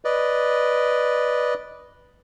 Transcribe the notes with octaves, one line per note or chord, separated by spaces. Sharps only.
B4 D5 D#5